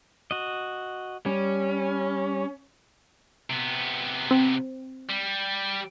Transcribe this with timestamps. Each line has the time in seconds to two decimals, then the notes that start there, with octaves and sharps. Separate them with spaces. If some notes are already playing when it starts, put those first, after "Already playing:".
0.31 F#4 D#5
1.26 G3 C#4
3.50 C3 B3
4.31 C4
5.09 G3